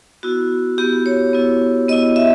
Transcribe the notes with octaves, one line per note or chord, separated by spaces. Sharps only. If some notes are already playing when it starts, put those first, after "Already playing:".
B3 E4 F#4
B3 E4 G4
C#5
B3 E4
B3 E4 D#5
E5